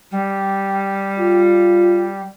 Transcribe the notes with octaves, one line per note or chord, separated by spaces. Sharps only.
G3
F4